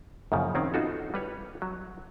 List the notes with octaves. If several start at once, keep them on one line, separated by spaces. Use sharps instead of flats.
F#2 A#2 C#3 F3
D#3 C4 C#4
B3 D#4 F4 F#4 A4
G3 B4 C#5
F#3